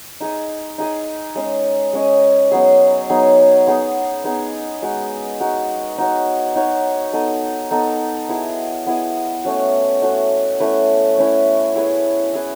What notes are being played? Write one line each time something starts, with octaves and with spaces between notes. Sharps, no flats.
D#4 G#4 D#5
D#4 G#4 D#5
G#3 C#4 G#4 D#5
G#3 C#4 G#4 D#5
F#3 B3 D#4 G#4
F#3 B3 D#4 G#4
B3 D#4 G#4
B3 D#4 G#4
G#3 D#4 F#4
G#3 D#4 F#4
D#4 F#4 C#5
D#4 F#4 C#5
B3 D#4 A4 D#5
B3 D#4 A4 D#5
B3 E4 G#4 D#5
B3 E4 G#4 D#5
A3 C#4 F#4
A3 C#4 F#4
A3 C#4 E4 B4
A3 C#4 E4 B4
E4 G#4 B4
E4 G#4 B4